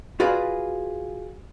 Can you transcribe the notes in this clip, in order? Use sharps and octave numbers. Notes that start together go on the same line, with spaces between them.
F4 F#4 G#4 B4 D5 F5